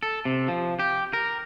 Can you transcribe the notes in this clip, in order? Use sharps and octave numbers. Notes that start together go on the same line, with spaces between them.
A4
C3
F3
G4
A#4